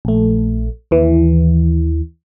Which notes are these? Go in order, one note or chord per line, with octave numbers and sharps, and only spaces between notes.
A#1 A3
D#2 E3